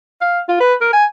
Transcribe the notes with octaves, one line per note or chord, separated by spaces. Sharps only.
F5
F4
B4
A#4
G#5